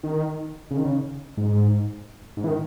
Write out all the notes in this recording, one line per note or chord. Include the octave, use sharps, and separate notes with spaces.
D#3
C#3
D#3
C#3
G#2
G#2
E3
D#3